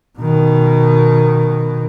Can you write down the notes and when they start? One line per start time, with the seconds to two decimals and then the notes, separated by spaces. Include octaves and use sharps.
0.19 B2 D#3